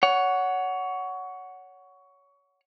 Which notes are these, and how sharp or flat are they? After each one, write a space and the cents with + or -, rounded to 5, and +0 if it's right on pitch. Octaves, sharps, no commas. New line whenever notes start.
C#5 +20 F#5 +0